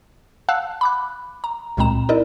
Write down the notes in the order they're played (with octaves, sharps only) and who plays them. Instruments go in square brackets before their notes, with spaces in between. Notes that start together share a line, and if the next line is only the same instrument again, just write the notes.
[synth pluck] F5 F#5 A5 E6 F#6
B5 D6 F#6
A#5
C#2 A#2 G#3 C4 A#5 E7
D#4 E4 A#4 D5 D#5